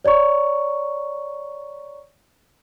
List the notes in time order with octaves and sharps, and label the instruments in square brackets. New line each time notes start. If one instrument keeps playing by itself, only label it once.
[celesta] C#5 D5 A#5 C#6